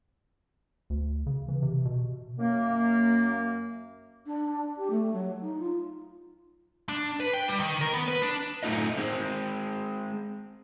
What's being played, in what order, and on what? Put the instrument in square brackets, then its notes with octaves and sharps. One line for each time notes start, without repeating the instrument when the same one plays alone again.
[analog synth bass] D2
C#3
E3
C3
B2
[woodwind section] F#2 A#3
[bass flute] D4
G4
A3
F#3
D#4
F4
[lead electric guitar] D4
B4
G5
G3
D#3
A#4
B3
B4
D4
[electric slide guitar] F#2 A2 A3 D#4 F4 D#5
G#3 C4